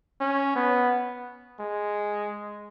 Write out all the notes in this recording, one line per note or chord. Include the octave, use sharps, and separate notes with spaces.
C#4
B3
G#3